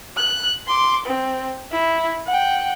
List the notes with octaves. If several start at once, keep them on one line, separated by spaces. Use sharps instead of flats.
F#6
C6 D6
C4
E4
F#5 G5